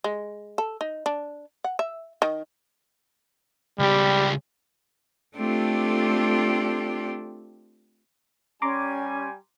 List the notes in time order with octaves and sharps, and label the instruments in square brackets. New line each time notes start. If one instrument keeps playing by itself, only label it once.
[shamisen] G#3
A4
D#4
D4
F#5
E5
D#3
[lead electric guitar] C#2 G4 [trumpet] G3
[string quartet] A3 C4 D4 F4 G4 A4
[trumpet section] G3 G#5 [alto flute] C#4 [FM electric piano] A#5 C6 D6